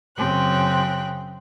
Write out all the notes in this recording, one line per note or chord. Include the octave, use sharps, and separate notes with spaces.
F#2 C#3 C4 G5 F#6